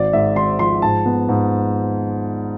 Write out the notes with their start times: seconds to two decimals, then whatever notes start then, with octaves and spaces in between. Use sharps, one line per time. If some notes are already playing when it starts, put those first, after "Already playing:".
Already playing: G#1 D5
0.13 G#2 E5
0.36 G#1 C6
0.59 F3 C6
0.82 G#2 A5
1.05 B3
1.29 G#2